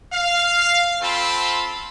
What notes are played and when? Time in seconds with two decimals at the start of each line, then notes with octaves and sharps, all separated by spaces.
0.13 F5
1.02 C4 F4 A4 A5 B5